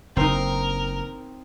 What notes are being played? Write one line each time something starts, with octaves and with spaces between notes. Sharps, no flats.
F#1 C4 D#4 A#4